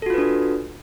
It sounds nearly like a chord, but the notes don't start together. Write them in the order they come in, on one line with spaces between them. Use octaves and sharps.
A4 F#4 F4 B4 D4